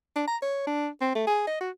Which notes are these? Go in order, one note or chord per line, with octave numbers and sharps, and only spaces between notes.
D4
A#5
C#5
D4
C4
A3
G#4
D#5
F#4